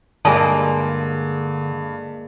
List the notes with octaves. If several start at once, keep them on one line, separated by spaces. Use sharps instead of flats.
G2 D3 G#3 A#3 G#5 A5